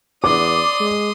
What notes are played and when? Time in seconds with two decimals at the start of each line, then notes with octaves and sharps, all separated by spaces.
0.24 E2 D5 C6 D6 D#6
0.80 G#3